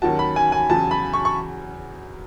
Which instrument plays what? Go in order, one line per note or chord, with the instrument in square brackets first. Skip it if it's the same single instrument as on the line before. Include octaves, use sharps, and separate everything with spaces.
[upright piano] D#2 D#3 F#3 C#4 F#4 [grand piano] A5
[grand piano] B5
G#5
G#5
[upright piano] E2 C#3 F#3 [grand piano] A5
[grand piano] B5
C#6
C#6